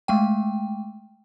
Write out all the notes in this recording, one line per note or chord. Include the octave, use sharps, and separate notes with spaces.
G#3 A3 G5